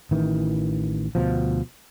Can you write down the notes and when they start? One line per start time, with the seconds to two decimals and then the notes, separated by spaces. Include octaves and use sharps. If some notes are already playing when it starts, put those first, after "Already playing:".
0.11 A1 D#3 E3
1.15 D2 B2 F3